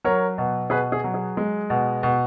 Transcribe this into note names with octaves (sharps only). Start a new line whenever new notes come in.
F#3 A#4 C#5
B2
B2 G#4 B4
G#4
F#3
G#4
G#3
B2
B2